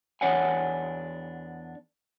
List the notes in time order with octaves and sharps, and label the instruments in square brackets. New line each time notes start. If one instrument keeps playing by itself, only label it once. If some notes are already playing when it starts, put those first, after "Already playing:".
[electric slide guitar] E2 D4 C#5 F#5 G#5